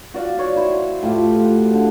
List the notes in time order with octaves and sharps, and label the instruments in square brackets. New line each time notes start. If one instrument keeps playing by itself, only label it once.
[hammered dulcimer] F#4 D5 F5
F#4 C#5
E4 C5
A2 F4 G4
F#4
D3